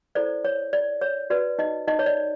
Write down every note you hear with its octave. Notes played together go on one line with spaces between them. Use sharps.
E4 A4 C5 D5
C#5
D5
C#5
F#4 B4 D5
D#4 D#5
D#4 D#5
C#5
D5